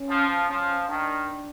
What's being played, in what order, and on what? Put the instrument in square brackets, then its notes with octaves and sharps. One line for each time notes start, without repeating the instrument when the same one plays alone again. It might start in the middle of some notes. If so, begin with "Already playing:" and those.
Already playing: [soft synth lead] C#4
[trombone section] F3
[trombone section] F3 [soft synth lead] C#4
[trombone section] D#3 [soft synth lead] D4